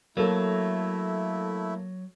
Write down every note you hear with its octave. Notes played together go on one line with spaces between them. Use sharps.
F#3 A3 A#3 E4 A4